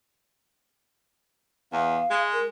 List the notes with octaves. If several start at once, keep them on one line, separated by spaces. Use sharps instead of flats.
E2 F5
G#3
A#4